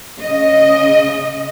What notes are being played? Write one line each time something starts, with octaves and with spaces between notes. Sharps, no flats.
C#3 D#5